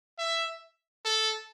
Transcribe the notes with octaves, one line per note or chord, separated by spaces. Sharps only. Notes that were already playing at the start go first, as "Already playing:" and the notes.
E5
A4